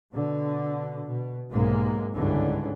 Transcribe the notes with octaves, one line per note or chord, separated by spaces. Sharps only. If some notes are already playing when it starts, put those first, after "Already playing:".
B2 D3
B2
B1 G#2 C3 G#3 A#3
G1 C#2 G#2 D3 E3 C#4